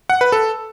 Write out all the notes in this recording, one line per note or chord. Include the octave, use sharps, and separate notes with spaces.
F#5
B4
A4